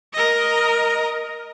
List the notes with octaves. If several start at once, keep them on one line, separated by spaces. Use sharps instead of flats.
A#4 D#5